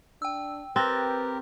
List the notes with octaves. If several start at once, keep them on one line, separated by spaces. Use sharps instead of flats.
D4 G5 E6
C4 G4 A#4 B4 F#6 A6 A#6